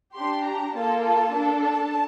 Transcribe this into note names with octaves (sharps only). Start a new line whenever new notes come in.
D4 G4 C6
A#5
A#3 F4 A4 A5
A5
D4 A4
A5